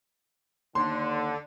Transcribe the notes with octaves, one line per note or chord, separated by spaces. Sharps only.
D#2 D3 C6